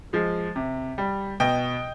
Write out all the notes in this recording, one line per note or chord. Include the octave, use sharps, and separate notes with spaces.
F3 G#3
C3
G3
B2 D#5 G5